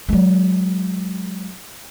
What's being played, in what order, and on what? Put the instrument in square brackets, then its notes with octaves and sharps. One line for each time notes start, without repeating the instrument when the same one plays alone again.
[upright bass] F#3 G#3